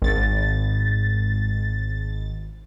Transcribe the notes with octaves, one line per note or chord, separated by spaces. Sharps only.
G#1 A6